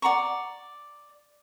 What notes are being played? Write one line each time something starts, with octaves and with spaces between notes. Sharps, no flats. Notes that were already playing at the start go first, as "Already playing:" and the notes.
D5 F#5 A#5 C#6